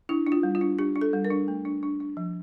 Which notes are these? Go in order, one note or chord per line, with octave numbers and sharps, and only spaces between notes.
D4 E4
D4
F4
G3
F4
D4
D4 G4
D4
A4
G3
A#4
D4
A3
D4
D4
D4
F3